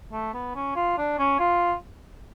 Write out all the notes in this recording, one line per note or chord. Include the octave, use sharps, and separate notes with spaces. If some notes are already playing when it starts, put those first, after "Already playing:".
A3
B3
C#4
F4
D4
C#4
F4